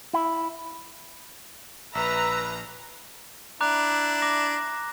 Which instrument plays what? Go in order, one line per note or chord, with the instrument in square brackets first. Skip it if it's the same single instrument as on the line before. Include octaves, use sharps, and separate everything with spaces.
[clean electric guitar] E4
[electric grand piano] A#1 [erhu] B4 [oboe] E5 [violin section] A#5
[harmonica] D4 E4 [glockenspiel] A#5 D6 F#6
[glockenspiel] D6 A#6